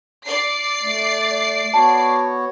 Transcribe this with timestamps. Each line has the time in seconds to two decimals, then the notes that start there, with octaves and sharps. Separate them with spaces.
0.24 D5 C7
0.83 A3
1.74 B3 F#4 C#5 A5